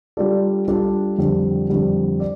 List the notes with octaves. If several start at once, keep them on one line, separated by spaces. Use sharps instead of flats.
G3 D4 F4 A4 D5
G3 D4 F4 A4 D5
F2 D3 G3
F2 D3 G3
D5